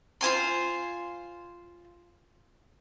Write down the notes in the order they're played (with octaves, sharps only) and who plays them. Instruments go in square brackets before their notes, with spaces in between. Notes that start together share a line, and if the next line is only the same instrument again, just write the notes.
[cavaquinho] F4 C5 G#5 C6